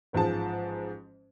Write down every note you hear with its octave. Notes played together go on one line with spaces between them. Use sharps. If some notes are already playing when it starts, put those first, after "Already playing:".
A1 G#2 F3 G#3 A5